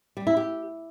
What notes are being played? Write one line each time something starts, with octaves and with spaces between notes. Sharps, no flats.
G3
E4
G4